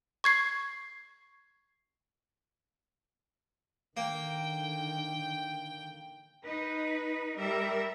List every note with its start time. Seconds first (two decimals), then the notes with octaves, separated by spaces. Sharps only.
0.24 C#6 G#6 C7
3.97 D3 D#3 A#3 G5
6.44 D#4 B4
7.38 G3 A#4 E5